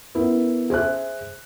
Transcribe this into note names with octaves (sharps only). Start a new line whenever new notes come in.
B3 E4 A#4
G#4 C5 E5 F#6